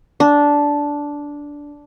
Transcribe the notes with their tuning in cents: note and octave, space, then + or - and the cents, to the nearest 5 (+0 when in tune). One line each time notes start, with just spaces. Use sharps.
D4 -10